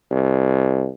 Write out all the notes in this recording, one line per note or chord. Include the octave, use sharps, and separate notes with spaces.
C2